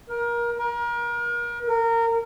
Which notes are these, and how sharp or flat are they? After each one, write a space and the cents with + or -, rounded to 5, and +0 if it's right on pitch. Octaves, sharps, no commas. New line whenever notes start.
A#4 +25
A#4 +35
A#4 -20